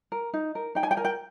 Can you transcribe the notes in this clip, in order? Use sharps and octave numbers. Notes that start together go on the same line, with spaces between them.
A#4
D#4
A#4
D#4 G5
G#5
G5
A#4 G#5
G5